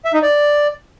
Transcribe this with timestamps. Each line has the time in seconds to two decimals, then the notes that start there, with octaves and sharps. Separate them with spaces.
0.05 E5
0.14 D#4
0.23 D5